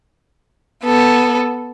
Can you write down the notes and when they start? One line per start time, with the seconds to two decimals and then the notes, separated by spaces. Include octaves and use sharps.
0.85 B3 A4